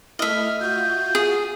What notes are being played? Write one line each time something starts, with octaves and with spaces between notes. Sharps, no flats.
A3 E4 D#5 E5 F6
F4 F#4 G6
G#4